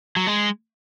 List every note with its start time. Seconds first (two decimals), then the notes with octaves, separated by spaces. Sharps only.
0.16 F#3
0.27 G#3